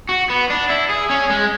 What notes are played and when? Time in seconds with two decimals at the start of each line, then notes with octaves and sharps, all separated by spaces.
0.09 F#4
0.30 B3
0.50 D4
0.69 E4
0.89 G#4
1.10 C#4
1.30 G#3